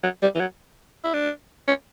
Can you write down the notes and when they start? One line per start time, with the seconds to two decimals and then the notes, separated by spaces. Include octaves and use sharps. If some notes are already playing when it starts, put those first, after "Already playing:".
0.03 F#3
0.22 G3
0.35 E3
0.40 F#3
1.04 E4
1.14 D4
1.68 C#4